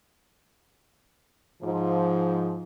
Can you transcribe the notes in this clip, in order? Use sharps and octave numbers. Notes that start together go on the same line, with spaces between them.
G#2 F3